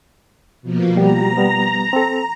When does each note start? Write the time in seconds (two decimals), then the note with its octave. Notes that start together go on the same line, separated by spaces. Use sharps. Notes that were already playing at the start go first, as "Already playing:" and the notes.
0.62 B2 F3 A#3
0.97 G3 F#4 G4 A#5
1.37 G3 B3
1.93 C4 A4